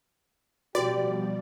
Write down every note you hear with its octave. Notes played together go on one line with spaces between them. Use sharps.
A1 B2 F3 G3 F#4 G4 D5